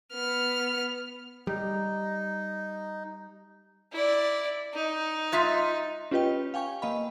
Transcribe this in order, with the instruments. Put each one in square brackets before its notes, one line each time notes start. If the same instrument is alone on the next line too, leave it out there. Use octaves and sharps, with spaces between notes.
[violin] B3 F6
[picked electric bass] G3 [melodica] D#4
[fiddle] E4 D5
D#4
[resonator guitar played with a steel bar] G#3 F4 E5
[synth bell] C#4 F4 G4 B4 D#5 G5
F5 G5 G#5 C#6
A#3 D#5 F5 B5